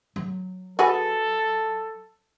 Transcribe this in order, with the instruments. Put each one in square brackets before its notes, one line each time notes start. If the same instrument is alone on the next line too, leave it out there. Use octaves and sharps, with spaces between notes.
[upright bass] F#3
[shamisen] F#4 G#4 B4 [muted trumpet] A4